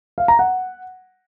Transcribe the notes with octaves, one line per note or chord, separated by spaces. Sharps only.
F5
A#5
F#5